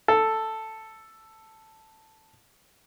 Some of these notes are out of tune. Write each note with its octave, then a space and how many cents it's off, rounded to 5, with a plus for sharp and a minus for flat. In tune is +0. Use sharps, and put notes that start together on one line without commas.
A4 +5